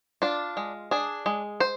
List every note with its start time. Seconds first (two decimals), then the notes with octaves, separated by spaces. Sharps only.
0.22 D4 F4
0.57 G#3
0.91 D4 G#4
1.26 G#3
1.60 C5